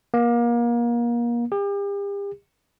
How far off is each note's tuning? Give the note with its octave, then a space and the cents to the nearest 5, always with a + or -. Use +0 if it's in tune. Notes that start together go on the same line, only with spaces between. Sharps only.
A#3 +30
G4 +40